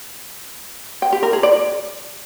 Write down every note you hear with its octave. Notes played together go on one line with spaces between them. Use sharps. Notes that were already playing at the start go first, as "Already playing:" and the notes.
G5
G4
A#4
G#4
D5